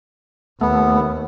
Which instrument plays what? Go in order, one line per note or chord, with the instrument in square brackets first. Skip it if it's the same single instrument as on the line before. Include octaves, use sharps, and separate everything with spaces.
[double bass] D#2 [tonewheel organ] A3 [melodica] B3